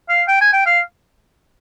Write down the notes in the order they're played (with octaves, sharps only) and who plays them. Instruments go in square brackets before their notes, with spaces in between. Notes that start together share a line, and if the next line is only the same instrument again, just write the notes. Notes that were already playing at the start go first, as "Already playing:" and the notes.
[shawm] F5
G5
G#5
G5
F5